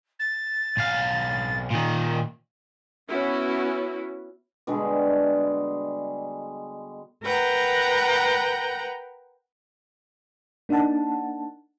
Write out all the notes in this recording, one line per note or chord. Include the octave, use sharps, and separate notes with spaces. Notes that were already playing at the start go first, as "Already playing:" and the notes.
A6
B1 F5
A#2 D#3
B3 C#4 E4 F#4
B2 D3 G3 G#3
A#4 B4 F#5 G5 A#5
A#3 D4 D#4 F#5 A5